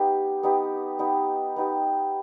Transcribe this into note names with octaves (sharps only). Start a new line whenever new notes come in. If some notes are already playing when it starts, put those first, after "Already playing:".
Already playing: B3 D#4 G4
B3 D#4 G4
B3 D#4 G4
B3 D#4 G4